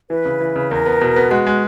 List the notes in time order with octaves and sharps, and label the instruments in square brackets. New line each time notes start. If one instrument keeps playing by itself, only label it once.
[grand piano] E3 [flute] B4
[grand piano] C#3
E3
C#3
[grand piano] E2 [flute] A#4
[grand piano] B3
B2
B3
[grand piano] G#3 [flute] F#4
[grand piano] G#3